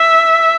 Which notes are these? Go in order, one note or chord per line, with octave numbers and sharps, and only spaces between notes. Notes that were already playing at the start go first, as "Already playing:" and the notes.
Already playing: E5